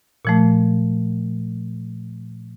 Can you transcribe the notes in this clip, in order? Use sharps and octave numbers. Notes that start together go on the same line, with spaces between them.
A#2 F3 A3